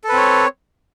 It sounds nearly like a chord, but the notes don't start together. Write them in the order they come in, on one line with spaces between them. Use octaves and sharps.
A4 B4 C4 C#5